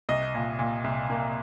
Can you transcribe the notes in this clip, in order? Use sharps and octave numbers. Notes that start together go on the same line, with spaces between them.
C2 D#5
A#2
A#2
C2
A#3